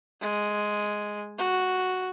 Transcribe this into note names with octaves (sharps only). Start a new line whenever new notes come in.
G#3
F#4